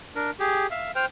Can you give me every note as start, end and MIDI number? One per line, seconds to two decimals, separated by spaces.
0.16 0.31 62
0.16 0.31 70
0.40 0.67 67
0.40 0.67 68
0.71 0.91 76
0.71 0.91 77
0.96 1.06 72
0.96 1.06 79
0.96 1.06 89